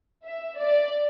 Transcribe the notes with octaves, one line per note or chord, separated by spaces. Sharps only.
E5
D5